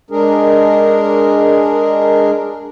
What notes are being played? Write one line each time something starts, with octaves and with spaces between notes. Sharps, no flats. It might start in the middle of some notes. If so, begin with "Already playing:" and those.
G#3 D4 G#4 A#4